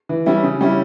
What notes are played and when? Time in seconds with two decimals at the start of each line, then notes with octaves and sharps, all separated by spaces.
0.09 E3
0.26 G3 C#4 E4
0.44 C#3
0.61 G3 C#4 E4